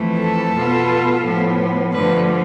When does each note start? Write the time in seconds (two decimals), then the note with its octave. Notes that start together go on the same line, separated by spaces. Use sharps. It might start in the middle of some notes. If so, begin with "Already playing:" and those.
Already playing: F2 E3 A3
0.19 A4
0.54 B2 B3 F4
1.24 A2 F3 B3
1.93 G2 D3 F3 A3 B4